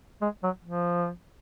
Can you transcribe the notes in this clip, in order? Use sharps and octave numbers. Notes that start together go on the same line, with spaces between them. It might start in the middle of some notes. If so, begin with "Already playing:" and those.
G#3
F#3
F3